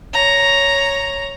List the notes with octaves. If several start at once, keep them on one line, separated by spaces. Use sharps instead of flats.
C#5 A#5